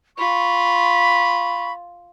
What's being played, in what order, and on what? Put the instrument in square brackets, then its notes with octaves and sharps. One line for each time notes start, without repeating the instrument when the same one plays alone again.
[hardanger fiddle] F4 [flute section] B5 C#6